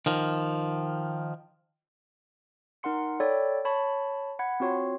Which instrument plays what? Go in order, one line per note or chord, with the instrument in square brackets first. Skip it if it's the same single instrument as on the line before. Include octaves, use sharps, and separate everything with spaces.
[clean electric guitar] D#3 F3
[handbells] D#4 A#4 F#5 C6 C#7
A4 C#5 D5 G5 B5
C#5 A5 B5 C#6
F#5 B5 G#6
C4 F4 F#4 C#5 C6